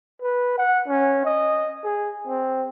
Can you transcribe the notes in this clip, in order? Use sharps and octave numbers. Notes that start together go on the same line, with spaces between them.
B4
F#5
C#4
D#5
G#4
C4